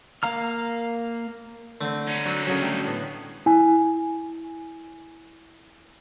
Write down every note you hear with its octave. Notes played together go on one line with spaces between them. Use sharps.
A#3 F5 A#5 F6
D3 A3 C4
C#4 D#4
F#3 C4 D4
C#3 F#3 A4 A#4 G#5
G3 A3 D4 E5
A2 B3 F#5
E4 G#5